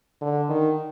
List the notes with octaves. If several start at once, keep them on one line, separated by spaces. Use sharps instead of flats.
D3
D#3